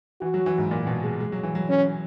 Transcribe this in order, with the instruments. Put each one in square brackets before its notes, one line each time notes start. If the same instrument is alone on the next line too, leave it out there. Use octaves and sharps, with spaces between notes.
[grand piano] E3 [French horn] F#4
[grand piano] F#3
E3
G#2
A#2
B2
G#3
G#3
F#3
E3
F#3
[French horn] C#4